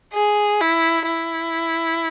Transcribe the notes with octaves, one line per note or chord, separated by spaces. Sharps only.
G#4
E4
E4